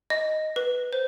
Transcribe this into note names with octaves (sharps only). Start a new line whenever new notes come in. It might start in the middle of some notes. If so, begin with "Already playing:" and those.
D#5
B4
C5